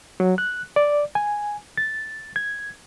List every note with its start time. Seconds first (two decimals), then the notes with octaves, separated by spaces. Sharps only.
0.20 F#3
0.38 F#6
0.76 D5
1.15 G#5
1.77 A6
2.36 G#6